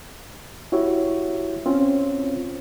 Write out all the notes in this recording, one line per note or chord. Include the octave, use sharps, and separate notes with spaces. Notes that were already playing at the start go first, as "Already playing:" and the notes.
E4 F#4 G4 C#5 E5
C4 C#4 F4 C5 C#5